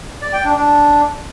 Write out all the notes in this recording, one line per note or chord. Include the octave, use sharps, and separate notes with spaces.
D5
G5
D4
D4